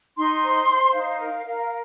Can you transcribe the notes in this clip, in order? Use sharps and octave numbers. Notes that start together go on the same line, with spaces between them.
D#4 C6
C5
C5
D#4 F5
A#4
A#4